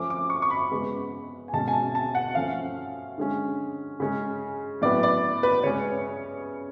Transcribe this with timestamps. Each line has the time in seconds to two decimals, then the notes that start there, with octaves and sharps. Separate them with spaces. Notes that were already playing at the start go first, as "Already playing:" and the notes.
Already playing: F3 A3 C#4 D6
0.10 D6
0.30 C#6
0.42 C#6
0.50 B5
0.72 C#3 G#3 B3
1.48 G#5
1.53 B2 G#3 C#4 A5
1.68 G#5
1.73 A5
1.95 A5
2.15 F#5
2.35 F3 A3 C#4 F5
3.18 D3 G#3 C#4
4.00 C#3 G#3 C#4
4.82 A2 F#3 B3 D5
5.03 D5
5.43 B4
5.63 C#3 G#3 C#4 C#5